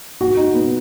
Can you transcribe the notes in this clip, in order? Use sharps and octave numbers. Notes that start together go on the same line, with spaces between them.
F#4
D#4
B3